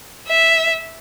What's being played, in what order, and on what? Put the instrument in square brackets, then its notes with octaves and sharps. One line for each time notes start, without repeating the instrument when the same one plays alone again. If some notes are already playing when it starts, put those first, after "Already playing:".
[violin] E5